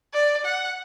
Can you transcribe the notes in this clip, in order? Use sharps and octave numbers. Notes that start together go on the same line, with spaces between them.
D5
F#5